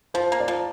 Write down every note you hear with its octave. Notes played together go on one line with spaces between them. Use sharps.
F3 C5
A#3
D5
F3